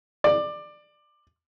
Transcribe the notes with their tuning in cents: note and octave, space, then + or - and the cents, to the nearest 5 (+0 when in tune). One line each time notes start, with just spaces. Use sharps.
D5 +20